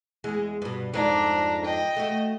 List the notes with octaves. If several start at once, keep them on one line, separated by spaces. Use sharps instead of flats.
E2 G#3
G2 B2
F2 G#2 D4 D5 A#5
D#5 G5
A3 F#4